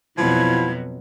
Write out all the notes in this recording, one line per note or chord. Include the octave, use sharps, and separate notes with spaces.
F2 B2 F3 F#3 E4 G#6